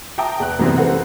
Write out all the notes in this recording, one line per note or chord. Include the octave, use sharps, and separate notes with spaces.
E5 G5 A5 A#5 D#6
E2 F#6
F#2 C#3 E3 G3 B3 C4
A4 B4 C5 F#5